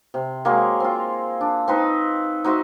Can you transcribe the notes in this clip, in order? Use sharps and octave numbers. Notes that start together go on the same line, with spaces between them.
C3
F#3 G#3 A#3
C4 F4
D4
C4 D#4 B4
D#4 F#4 C5 E5